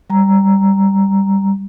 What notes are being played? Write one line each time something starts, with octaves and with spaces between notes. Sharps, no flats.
G3 A#5